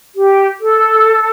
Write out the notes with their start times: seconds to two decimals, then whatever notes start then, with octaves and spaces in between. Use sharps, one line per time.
0.16 G4
0.59 A4